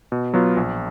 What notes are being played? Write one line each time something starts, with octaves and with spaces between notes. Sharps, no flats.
B2
F#3 B3 F4
A#1